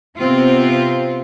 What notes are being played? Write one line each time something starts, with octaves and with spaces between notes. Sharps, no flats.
C3 B3 C4 F4